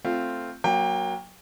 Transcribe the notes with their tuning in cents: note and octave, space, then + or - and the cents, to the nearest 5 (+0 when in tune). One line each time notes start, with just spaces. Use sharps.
A3 +0 C4 +0 F4 +0
F#3 +0 A#3 +20 G5 +30